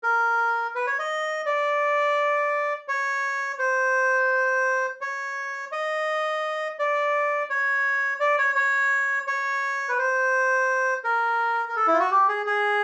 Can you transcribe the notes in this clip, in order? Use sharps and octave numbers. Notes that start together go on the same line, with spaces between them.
A#4
B4
C#5
D#5
D5
C#5
C5
C#5
D#5
D5
C#5
D5
C#5
C#5
C#5
B4
C5
A#4
A#4
A4
E4
F4
F#4
G4
G#4
G#4